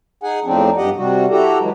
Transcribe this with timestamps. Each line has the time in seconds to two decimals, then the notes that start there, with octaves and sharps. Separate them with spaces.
0.23 D#4 G#4 F#5 G#5
0.45 E2 A2 F3 C4 D4 D#4
0.77 G2 G4 D#5 F#5
0.97 C3 G3 F#4
1.30 E4 F#4 G4 A4 A#5
1.60 E3 F#3 G#3